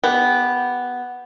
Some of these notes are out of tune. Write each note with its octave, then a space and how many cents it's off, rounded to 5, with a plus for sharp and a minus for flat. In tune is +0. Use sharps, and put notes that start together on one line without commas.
B3 +0 G4 +15